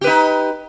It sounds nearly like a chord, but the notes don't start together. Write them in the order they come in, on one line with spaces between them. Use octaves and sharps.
G4 B4 D#4